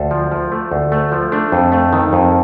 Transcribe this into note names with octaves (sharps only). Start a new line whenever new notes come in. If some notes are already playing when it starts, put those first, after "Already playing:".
Already playing: D2 A4 C5
F3
F3
A3
D2
A3
F3
A3 D4
F2
A3
D#3
F2